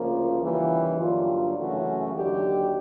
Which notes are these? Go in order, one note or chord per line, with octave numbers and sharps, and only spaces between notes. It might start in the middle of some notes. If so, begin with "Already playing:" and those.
Already playing: D2 C#3 F3 A#3
F4
D#2 C#3 E3 G3
G2 D3 F#3 A#3 F4
F#2 C#3 E3 A3 F#4
D#2 D3 F#3 G4